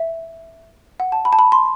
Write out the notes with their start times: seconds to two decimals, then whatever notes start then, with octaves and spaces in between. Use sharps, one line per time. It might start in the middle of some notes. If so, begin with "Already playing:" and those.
Already playing: E5
1.00 F#5
1.12 A5
1.25 B5
1.33 A5
1.39 B5
1.52 C6